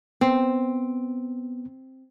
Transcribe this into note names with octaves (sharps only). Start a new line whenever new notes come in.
B3 C4